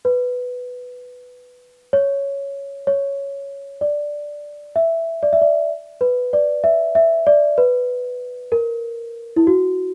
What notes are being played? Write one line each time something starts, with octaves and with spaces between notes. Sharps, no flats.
B4
C#5
C#5
D5
E5
D5
E5
D5
B4
D5
E5
E5
D5
B4
A#4
E4
F#4